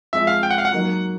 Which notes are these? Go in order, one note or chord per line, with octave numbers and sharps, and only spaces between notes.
F3 G#3 C4 F4 E5
F5
G5
F#5
F5
F#5
F#3 A#3 D#4